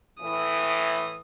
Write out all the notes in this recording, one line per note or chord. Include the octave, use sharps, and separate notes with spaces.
A2 E3 D#6